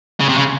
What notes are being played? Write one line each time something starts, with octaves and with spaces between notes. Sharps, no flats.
C#3
C3
C#3